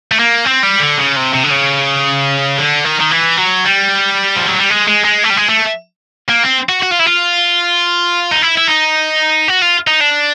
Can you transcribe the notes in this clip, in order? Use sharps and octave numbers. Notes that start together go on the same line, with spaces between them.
A3
A#3
C4
G3
D3
C#3
C3
C3
D3
C#3
D3
D#3
D#3
E3
F#3
G3
F3
F#3
G3
G#3
G#3
G#3
A3
G3
G#3
A3
A#3
C4
F#4
F#4
F4
E4
F4
D#4
E4
E4
D#4
F#4
F4
D#4
D4